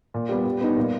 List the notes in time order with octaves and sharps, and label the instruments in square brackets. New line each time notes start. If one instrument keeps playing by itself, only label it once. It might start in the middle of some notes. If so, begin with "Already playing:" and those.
[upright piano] A#2
G3 B3
G3
B3 D#4
A#2